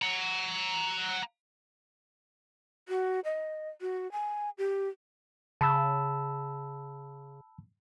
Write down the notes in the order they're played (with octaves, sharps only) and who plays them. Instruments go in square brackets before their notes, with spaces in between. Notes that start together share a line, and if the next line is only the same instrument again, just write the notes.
[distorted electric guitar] F#5 A#5
[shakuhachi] F#4
D#5
F#4
G#5
G4
[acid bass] C#3 [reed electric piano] A5 B5 E6